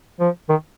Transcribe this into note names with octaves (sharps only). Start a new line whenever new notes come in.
F3
D#3